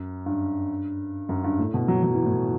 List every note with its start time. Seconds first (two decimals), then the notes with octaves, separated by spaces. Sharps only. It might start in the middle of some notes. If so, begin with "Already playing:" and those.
Already playing: F#2
0.26 G2
1.29 F#2
1.44 G2
1.59 A2
1.74 B2
1.88 F#3
2.03 F#3
2.14 E3
2.25 A2